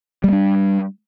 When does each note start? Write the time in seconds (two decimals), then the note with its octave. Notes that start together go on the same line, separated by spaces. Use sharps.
0.24 G3
0.28 A3
0.33 D4